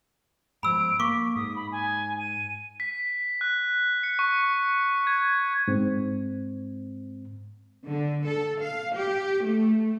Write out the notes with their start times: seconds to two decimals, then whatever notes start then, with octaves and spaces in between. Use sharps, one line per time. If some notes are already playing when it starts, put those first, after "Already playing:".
0.63 G#2 F3 B5 E6 D7
1.00 A#3 C#6 D6 B6
1.36 G#2 D#6
1.56 B5
1.72 G#5
2.19 D#7
2.80 B6
3.41 F#6
4.03 C#7
4.19 C#6
5.07 G#6
5.68 G#2 C4
7.87 D3
8.29 A4
8.61 F5
8.95 G4
9.46 A3